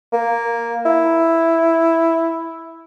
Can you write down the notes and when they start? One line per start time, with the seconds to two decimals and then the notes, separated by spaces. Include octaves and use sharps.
0.13 A#3
0.85 E4